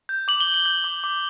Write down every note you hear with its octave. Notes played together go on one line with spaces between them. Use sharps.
G6
D6 F#7
G7
D6
F#7
G6
D6
D6